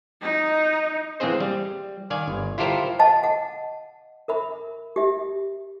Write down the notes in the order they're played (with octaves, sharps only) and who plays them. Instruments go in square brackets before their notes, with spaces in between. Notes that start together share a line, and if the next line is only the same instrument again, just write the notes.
[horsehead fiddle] D#4
[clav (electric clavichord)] E3 G#3 A#3 C4 G#4 C5
G3
D#3 D5 F5 G#5
G1
E4 F4 G4 A4 A#4 C5
[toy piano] D#5 F5 F#5 A5
F#5
A#4 E5 B5
G4 E5